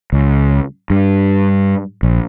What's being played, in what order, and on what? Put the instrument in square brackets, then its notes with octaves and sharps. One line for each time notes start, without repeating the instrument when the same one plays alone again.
[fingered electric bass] C#2
G2
A#1